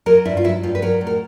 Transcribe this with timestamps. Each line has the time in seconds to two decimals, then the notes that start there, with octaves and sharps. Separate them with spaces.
0.06 F#3 A#4
0.25 G2 E4
0.37 F4
0.44 F#3 E4
0.63 G2 F4
0.75 B4
0.82 F#3 A#4
1.01 A2
1.07 A#4